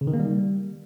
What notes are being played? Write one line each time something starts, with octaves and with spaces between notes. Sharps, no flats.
C#3
D#3
A#3
G3